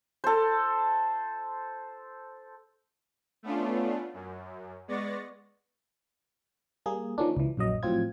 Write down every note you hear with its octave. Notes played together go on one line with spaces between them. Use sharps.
A4 C5
A3 B3 C#4 D4 F4
F#2
G#3 B3 D5 C#6 A6 A#6
G3 A#3 G#4
D#3 F3 A#3 C#4 D4
C#2 E3
A#1 F#2 F#3 D#5
A2 F3 F#3 C4 F4 G#6